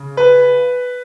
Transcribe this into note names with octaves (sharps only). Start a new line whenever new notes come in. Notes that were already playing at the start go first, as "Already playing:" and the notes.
Already playing: C#3
B4